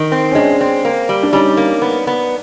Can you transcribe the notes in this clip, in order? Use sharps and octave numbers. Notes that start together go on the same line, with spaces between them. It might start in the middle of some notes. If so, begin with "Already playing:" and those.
Already playing: D#3
C4
C#4
G#3 D4
C4
A#3
G3
D4
G3 C#4 D#4
A#3
B3
B3